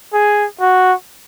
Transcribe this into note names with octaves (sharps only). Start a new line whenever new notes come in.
G#4
F#4